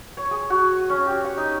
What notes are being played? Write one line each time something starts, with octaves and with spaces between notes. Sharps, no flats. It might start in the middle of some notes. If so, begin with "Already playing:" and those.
C#5
G#4
F#4
C#4
G4
C#6
D#4